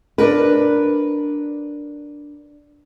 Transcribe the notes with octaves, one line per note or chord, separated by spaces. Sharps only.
D4 A#4 B4